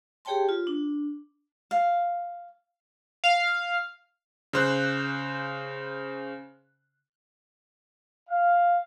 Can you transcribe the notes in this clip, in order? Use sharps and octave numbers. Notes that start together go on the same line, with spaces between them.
G4 G#4 C#5 G5 A5 C6
F4
D4
F5
F5
C#3 C5 F#6
F5